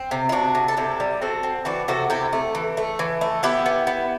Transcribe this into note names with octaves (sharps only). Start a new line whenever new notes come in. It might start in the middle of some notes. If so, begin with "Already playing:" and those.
Already playing: C4
C3
E4
C3 D4 F#4
C3
A4
C3 E4 G4
G3
C4 F#4 A4
C4
E3 D4 F#4
C3 F#4 A4
C3 E4 G4
A3
E3
A3
E3
A3
B3 E4 G4
B3
B3